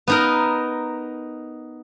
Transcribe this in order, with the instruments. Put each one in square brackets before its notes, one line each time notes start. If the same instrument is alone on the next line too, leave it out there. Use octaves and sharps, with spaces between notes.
[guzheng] B3 D#4 A#4